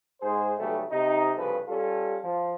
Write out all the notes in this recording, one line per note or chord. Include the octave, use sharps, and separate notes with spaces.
G#2 D#4 G#4 C5
B1 E2 C#3 G3 A3
C3 D#4
C2 G2 C#3 F3 A4 B4
G3 C#4 F4 A4
F3